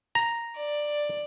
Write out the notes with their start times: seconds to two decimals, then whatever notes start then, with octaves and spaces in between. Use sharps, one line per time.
0.15 A#5
0.56 D5